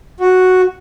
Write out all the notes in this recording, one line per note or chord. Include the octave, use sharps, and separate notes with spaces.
F#4